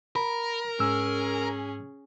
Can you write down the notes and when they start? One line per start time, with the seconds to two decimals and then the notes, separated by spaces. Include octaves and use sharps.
0.16 A#4 B5
0.80 G#2 C#4 G#4 E6